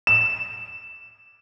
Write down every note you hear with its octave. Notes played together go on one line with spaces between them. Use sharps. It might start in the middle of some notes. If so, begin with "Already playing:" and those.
E7